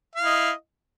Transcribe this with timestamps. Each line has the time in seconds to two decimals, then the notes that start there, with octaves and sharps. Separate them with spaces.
0.15 F5
0.20 E4
0.25 D#5